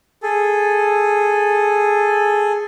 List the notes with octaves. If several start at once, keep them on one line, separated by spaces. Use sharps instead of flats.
G#4 A4